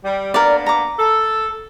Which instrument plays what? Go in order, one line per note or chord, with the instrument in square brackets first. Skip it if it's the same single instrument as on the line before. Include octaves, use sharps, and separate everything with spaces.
[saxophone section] G3
[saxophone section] A#3 B3 D4 [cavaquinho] A#4 D5
[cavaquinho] A#5 D6
[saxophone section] A4